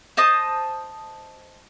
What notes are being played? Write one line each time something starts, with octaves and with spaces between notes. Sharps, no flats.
C5 D#5 A5 D#6